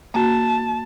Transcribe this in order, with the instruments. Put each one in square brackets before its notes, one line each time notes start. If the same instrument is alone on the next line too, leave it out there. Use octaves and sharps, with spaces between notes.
[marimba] A#3 F#4 [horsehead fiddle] A5